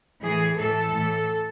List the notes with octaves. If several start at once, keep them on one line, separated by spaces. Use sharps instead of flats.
A2 E3 G#4
A2 E3 A4
A2 E3